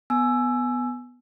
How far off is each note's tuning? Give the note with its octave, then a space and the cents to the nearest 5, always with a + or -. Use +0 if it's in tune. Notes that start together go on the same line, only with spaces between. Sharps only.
B3 +0 G#5 +20 E6 +10